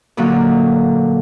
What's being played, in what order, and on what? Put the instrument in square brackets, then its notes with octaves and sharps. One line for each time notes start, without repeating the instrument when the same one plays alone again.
[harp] A#2 D3 F#3 A#3